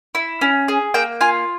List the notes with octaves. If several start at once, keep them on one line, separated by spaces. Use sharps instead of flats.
E4
C#4
G#4
A#3 G5
F4 G#5